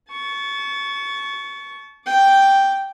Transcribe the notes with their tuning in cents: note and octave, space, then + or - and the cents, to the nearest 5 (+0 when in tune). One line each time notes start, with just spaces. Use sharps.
A5 -30 C#6 +15
G5 +0 D6 -5